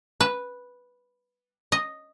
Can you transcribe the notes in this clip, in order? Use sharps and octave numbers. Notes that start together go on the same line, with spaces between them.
B4
D#5